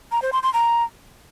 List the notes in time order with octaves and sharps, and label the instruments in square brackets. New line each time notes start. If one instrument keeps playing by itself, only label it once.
[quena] A#5
C5
C6
C6
A#5